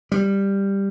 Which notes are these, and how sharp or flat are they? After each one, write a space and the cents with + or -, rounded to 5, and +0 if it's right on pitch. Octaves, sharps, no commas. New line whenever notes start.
G3 +10